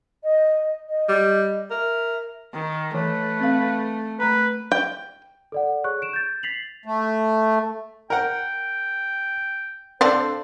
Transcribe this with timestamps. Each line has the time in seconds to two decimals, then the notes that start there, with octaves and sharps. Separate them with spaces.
0.23 D#5
0.88 D#5
1.09 G3
1.71 A#4 E5
2.54 D#3
2.94 E3 A3 B4
3.40 C4 F5
4.20 A3 B4 A#5
4.72 G5
5.52 A4 D5 F#5
5.84 G#4 C#5 C#6 F#6
6.02 D7 E7
6.13 G6 A6
6.43 A6 B6 C7 F7 F#7
6.86 A3
8.10 A#4 F#5 G5
10.01 D3 C4 D4 A4 C5 F5